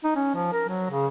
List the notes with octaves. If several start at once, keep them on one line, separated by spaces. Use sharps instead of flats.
D#4
C#4
F3
A#4
F#3
C#3